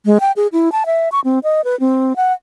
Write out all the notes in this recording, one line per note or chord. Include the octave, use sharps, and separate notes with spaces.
G#3
G5
G#4
E4
A5
E5
C#6
C4
D#5
B4
C4
F#5